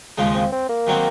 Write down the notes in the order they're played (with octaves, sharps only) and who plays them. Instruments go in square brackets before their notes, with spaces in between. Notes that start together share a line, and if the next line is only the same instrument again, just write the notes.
[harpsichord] D#2 C#3 F3 G#3
[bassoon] C4
C4
A#3
[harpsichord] D#3 F#3 C4 F#4